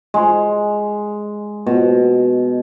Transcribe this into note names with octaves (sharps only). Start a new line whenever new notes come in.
G#3
B2